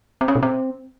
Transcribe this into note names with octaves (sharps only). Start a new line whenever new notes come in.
C4
C#4
B2
C4